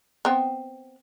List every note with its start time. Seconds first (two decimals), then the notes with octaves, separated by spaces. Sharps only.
0.25 B3 C4